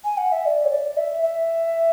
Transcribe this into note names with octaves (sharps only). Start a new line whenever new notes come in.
G#5
F#5
E5
D5
C#5
D5
E5
E5